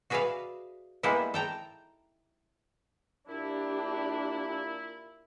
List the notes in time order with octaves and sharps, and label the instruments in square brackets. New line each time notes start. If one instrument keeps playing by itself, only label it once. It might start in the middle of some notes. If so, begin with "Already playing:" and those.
[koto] F#4 G#4 B4 D5 E5 F5
G3 G#3 A#3 B3 D#4 E4
A4 G5 A#5
[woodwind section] A#2 E4 [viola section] D4 G4